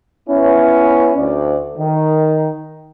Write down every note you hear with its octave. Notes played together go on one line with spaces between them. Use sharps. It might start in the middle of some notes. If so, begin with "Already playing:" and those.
B3 C#4 E4
D2 D5
D#3